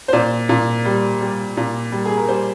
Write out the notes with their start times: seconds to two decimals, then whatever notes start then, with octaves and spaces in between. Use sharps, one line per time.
0.08 C5
0.13 A#2 D5
0.49 A#2
0.85 G3
1.21 G3
1.57 A#2
1.92 G3
2.05 G#4
2.17 A#4
2.28 G3 C5